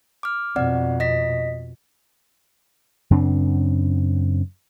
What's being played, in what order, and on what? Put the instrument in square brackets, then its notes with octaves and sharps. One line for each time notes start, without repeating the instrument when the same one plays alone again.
[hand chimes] D6 F6
[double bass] F2 B2 [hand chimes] C4 D5 F#5
[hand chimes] D#5 A#6 B6
[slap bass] F#2 C#3 C4 D4